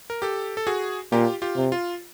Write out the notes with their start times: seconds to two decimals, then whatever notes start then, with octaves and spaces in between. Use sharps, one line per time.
0.10 A#4
0.22 G4 A4
0.57 A4
0.67 F#4 G#4
1.12 A#2 F4 G4
1.42 F4 G4
1.57 C3
1.72 F4